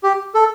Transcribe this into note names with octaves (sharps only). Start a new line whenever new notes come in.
G4
A4